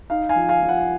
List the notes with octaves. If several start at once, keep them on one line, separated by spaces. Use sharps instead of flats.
D#4 F5
F5 G#5
F3
F5 G#5
F3
F#5